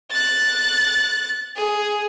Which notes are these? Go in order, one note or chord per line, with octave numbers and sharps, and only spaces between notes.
F#6 A6
G#4